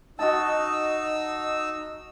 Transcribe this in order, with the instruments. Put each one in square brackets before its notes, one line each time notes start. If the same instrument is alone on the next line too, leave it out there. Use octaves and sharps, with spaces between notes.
[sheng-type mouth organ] D#4 E6 [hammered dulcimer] F#4 D#5 A5